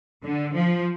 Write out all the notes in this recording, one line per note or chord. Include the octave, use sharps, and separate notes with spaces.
D3
F3